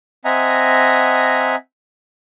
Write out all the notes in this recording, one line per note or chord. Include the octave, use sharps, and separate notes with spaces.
C4 D#5 E5 F#5 G#5 A#5